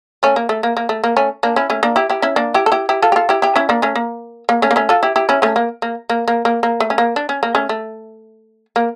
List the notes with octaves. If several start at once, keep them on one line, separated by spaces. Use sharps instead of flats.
A3 C#4
A#3
A3
A#3
A#3
A3
A#3
A3 C#4
A#3 D4
C#4 E4
A3 C#4
A#3 D4
E4 G4
E4 G4
C#4 E4
A#3 D4
E4 G4
A4
E4 G4
E4 G4
F4 A4
G4
F4 A4
E4 G4
E4 G4
C#4 E4
A#3 D4
A3 C#4
A#3
A#3
A3 C#4
A#3
A3 C#4
F4 A4
E4 G4
E4 G4
C#4 E4
A3 C#4
A#3
A#3
A#3
A#3
A#3
A#3
A3
C#4
A#3
D4
C#4
A#3
A3 C#4
A3
A#3